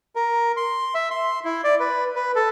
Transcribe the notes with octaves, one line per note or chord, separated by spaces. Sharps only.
A#4
C6
E5
C6
E4
D5
B4
B4
A4